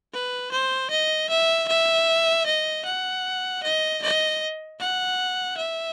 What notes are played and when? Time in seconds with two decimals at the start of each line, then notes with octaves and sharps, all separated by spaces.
0.13 B4
0.52 C5
0.91 D#5
1.30 E5
1.68 E5
2.46 D#5
2.85 F#5
3.63 D#5
4.03 D#5
4.80 F#5
5.58 E5